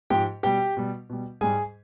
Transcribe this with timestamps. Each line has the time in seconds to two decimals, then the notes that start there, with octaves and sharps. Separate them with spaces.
0.10 G#2 F3 G4 G5
0.43 B2 G3 G4 G5
0.77 B2 G3
1.10 B2 G3
1.41 G#2 G3 G#4 G#5